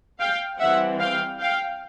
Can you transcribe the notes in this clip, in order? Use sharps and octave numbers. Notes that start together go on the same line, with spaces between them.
F5 G5
E3 G3 C4 E5 F#5
F5 G5
F5 G5